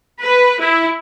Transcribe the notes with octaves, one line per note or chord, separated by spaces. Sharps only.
B4
E4